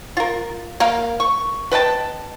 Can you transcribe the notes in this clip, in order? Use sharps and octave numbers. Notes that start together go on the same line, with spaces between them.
F4 A#4
A#3 A#4 F5
C#6
B4 D#5 G5 A5